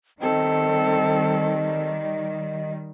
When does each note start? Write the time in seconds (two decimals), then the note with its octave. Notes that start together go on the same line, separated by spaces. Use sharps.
0.21 D#3 G3 C4 A4 D#5